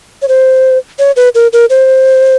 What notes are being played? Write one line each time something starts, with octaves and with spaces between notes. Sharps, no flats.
C#5
C5
C#5
B4
A#4
A#4
C5